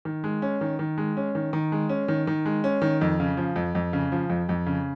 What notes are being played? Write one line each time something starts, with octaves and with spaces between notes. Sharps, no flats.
D#3
G#3
C#4
D#3
D#3
G#3
C#4
D#3
D#3
G#3
C#4
D#3
D#3
G#3
C#4
D#3
F2
C#3
F3
F2
F2
C#3
F3
F2
F2
C#3